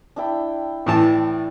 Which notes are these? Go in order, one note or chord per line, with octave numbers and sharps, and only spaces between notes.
D4 E4 G5
A2 E3 A5